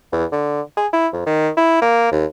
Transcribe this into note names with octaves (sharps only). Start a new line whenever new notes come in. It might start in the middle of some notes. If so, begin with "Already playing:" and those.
E2
D3
G#4
E4
F2
D#3
E4
A#3
D#2